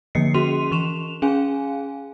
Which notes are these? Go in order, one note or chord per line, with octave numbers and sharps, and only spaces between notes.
D3 F3 A#3 D#5 C7 C#7
C#4 F#4 G#4 C6 D#7 F7
E3 C#6 E7 F7
C#4 G#4 F5 G#5